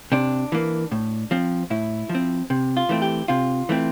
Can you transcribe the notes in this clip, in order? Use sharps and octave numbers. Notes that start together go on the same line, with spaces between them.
C3 D4
E3 A#3
A2
F3 C4
A2 E4
F3
C4
C3
F4
E3 A3 C4
G4
C3 F4
E3 A3 C4